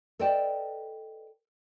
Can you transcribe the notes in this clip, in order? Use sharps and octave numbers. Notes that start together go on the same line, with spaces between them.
A4 B4 D5 D#5 G5 A5